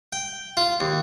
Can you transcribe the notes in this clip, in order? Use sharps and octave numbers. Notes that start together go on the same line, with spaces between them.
G5
F4
D#2